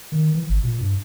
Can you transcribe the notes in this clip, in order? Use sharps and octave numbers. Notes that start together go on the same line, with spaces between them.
D#3
E3
G#1
A#2
G2